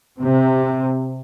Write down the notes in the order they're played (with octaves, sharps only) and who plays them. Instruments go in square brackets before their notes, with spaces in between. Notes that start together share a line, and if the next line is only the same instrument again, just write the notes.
[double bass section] C3